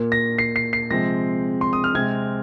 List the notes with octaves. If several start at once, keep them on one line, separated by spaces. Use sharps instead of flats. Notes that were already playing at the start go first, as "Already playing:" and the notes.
Already playing: A#2 A#3
A#6
C7
C7
C7
C3 F3 G#3 C4 A#6
C6
D#6
F6
C3 G#3 C4 G#6